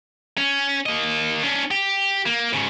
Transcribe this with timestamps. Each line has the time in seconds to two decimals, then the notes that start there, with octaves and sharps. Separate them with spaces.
0.38 C#4
0.86 A#3 D#5
1.43 C#4 D4
1.71 G4
2.26 A#3
2.53 G#2 C#3